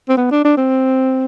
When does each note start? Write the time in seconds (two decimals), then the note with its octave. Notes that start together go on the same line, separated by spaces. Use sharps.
0.09 C4
0.17 B3
0.31 D4
0.45 D4
0.57 C4